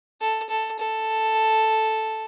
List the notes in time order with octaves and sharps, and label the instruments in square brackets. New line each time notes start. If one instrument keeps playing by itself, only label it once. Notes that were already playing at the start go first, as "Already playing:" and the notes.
[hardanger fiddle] A4
A4
A4